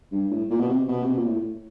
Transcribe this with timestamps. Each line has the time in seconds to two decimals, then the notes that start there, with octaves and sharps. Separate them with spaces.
0.12 G2
0.31 A2
0.50 A#2
0.60 B2
0.69 C3
0.88 B2
1.03 C3
1.10 B2
1.17 A#2
1.25 A2